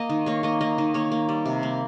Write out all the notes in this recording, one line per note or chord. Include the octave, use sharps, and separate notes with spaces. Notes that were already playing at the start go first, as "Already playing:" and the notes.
Already playing: A#3 D#5
D#3
A#3 C#5
A#3 D#5
A#3 D#5
D#3
A#3 C#5
A#3
G3
C3
A#3